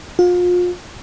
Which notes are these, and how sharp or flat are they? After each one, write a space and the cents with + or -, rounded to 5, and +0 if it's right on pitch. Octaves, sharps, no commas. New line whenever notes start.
F4 +35